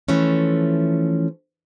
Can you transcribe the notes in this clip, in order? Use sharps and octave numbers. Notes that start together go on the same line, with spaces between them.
E3 F3 A3 C#4